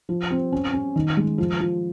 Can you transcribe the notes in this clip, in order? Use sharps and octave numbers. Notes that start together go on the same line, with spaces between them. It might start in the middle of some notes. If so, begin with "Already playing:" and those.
F3
C4
C#4
C#4
D#3
G#3
F3
F3